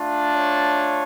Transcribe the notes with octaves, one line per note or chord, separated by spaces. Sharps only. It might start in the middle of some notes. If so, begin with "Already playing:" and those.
Already playing: A3 D4 F4
C#5